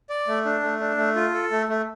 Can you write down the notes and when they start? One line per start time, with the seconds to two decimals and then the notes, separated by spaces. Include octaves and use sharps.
0.10 D5
0.27 A3
0.45 D4
0.63 A3
0.80 D4
0.97 A3
1.16 F4
1.33 A4
1.51 A3
1.69 A3